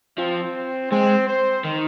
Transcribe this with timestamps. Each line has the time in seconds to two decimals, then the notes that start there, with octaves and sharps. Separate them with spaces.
0.18 F3 C4
0.91 G#3 C4
1.28 C5
1.64 D#3